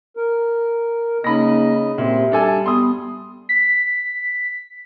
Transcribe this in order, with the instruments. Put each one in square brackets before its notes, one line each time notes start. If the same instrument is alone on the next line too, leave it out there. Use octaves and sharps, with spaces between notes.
[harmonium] A#4
[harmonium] C#3 D#5 [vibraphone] A#3 D#4 [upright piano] B5 A#6
[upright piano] A#2 [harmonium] C4 [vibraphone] G4 E5
[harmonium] G3 [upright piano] D4 A4 G#5
[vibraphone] B3 [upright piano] C6 D#6
[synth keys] B6